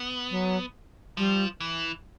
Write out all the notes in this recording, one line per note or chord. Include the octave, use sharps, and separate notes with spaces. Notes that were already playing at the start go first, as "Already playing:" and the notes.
Already playing: B3
F#3
F3 G3
E3